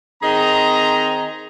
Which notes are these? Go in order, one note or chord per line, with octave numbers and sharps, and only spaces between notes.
D#3 C4 G#4 D#5 A#5